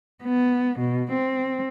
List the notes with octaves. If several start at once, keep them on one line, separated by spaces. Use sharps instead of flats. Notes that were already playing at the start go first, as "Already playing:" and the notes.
B3
B2
C4